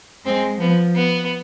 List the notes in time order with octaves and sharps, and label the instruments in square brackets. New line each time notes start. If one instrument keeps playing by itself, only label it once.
[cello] G#3 [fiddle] C4
[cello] F3 [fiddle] B3
[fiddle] B3